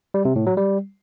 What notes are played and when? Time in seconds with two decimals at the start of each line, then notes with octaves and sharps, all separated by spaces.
0.14 G3
0.25 C3
0.36 A2
0.47 F#3
0.57 G3